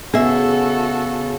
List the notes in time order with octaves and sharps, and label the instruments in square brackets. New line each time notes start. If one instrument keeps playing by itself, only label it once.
[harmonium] C#3 [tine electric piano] B3 [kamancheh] F#4 A4 [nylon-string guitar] G#4 E5